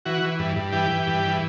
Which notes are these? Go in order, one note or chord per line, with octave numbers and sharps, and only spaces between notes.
E3 F#4
E3
G2
G2
E3 G4
E3
G2
E3